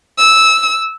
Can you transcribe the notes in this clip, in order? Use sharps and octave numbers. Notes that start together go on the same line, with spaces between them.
E6